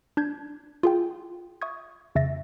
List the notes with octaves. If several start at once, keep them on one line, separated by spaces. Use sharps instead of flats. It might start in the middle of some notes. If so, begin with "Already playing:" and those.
D4 G6 G#6
F4 G#4 G5
E5 C#6 D#6 G#6
F2 C#3 E5 A6 A#6